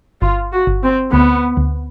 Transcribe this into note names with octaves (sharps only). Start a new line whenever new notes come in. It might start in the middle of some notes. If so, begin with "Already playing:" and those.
G1 F4
F#4
G1
C4
D2 B3
D2